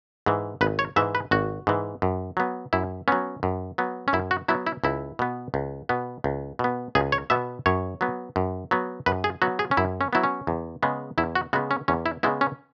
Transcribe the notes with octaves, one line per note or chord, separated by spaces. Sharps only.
G#2 E3
G#1 B4
C#5
G#2 E3 E5
B4
G#1 F#4
G#2 E3
F#2
F#3 B3
F#2 E4
F#3 B3 C#4
F#2
F#3 B3
C#4
F#2 E4
F#4
F#3 B3 E4
E4
C#2 E4
B2 B3
C#2
B2 B3
C#2
B2 B3
C#2 G#4
C#5
B2 B3 E5
F#2 C#5
F#3 B3
F#2
F#3 B3
F#2 B4
G#4
F#3 B3 F#4
G#4
C#4
F#2 E4
C#4
F#3 B3 E4
C#4
E2
C#3 G#3 B3
E2 E4
F#4
C#3 G#3 B3 F#4
C#4
E2 C#4
E4
C#3 G#3 B3 E4
C#4